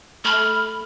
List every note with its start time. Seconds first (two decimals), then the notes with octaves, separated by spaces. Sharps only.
0.25 A3 B5 F6